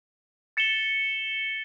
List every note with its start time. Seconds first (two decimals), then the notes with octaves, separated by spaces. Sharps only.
0.57 A6 C#7 E7 G7